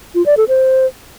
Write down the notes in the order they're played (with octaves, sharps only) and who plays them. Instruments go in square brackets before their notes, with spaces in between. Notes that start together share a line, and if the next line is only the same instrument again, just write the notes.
[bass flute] F4
D5
A4
C5